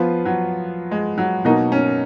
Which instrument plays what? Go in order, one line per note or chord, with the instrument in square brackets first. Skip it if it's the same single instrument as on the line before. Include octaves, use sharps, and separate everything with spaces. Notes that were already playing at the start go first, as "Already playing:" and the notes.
Already playing: [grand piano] F3 B3 F4
[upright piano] F#3
G#3
F#3
[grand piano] B2 A#3 D#4 F#4 A#4 [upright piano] F#3
[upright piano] C#4